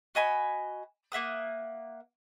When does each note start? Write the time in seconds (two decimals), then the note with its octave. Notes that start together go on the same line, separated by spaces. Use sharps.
0.15 F#4 D#5 G#5 B5
1.12 A#3 E5 F#5 D#6